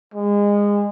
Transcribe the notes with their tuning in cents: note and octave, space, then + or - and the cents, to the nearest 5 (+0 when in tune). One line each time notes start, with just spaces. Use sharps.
G#3 -25